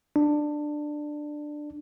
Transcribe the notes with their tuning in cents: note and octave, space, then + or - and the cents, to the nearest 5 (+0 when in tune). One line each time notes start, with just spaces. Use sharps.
D4 +15